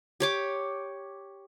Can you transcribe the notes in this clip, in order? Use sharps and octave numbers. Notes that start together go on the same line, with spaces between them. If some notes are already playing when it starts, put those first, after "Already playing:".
G4 C#5 D6